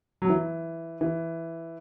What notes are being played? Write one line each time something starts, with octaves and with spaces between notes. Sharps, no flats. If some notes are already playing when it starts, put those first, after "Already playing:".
F#3
E3
E3